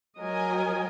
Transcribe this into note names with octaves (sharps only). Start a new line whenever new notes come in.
F#3 A#4 D#5 G#5